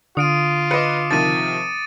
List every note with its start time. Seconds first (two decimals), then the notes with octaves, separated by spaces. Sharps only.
0.17 D3 F4 D#6 D7 D#7
0.71 B4 D#5 D6 C#7
1.11 C3 D#3 F3 A6 D#7